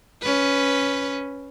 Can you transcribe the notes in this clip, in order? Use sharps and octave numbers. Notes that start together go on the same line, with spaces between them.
C#4 B4